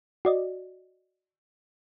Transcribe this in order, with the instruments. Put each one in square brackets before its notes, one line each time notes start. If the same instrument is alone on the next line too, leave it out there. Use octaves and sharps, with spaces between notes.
[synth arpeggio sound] F#4 D5 D#5